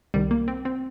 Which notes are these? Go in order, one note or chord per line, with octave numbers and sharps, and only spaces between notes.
C2 C3 D#3 G3
A#3
C4
C4